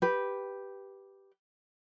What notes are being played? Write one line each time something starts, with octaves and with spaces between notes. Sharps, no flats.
G4 B4